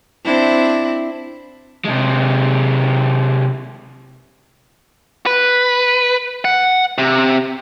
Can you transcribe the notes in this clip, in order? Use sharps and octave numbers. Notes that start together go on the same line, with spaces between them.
C4 D4 E4
C3 G#3
B4
F#5
C3